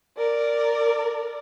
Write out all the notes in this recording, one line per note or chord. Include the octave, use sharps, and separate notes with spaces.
A#4 D5